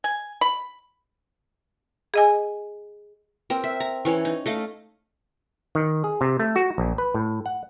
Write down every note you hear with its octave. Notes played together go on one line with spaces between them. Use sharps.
G#5
B5
G#4 D#5 G#5
C4 A#4
E5
A#5
E3 C#4 C#5
D#4
A3 D#5 F5
D#3
G#4
C3
A3
F#4
A#1
B4
A2
F#5